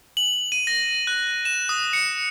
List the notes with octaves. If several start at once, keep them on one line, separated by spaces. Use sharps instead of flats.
F#7
D#7
A#6
F#6
E7
D#6
C#7